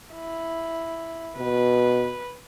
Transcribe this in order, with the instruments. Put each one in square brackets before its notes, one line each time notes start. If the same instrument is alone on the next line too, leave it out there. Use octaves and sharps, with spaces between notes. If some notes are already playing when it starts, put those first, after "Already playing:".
[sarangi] E4
[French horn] B2 [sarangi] B4